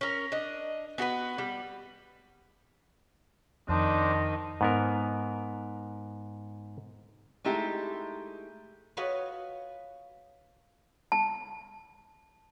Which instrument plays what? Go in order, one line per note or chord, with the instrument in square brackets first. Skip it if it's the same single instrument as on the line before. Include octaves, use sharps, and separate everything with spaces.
[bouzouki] C#4 A#4
D4 D#5
B3 F#4 G#4 B4
G3
[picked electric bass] F2 [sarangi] D#3 [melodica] D4 C5
[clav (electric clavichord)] G#2 B3 A#4
[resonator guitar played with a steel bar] G#3 A3 D#4 E4 G4
[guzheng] F4 F#4 B4 C#5 D#5
[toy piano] A5